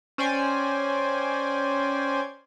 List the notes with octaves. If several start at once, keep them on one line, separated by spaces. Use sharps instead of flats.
C#4 C5 D5 G5 G#5